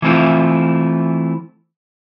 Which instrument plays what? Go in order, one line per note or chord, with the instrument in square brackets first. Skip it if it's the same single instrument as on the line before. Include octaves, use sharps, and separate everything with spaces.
[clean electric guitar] E3 A3 C4 E4 F4